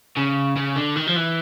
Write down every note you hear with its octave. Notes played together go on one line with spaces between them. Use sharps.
C#3
C#3
D3
D#3
F3
E3